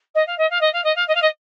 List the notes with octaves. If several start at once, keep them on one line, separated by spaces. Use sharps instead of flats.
D#5
F5
D#5
F5
D#5
F5
D#5
F5
D#5
F5
D#5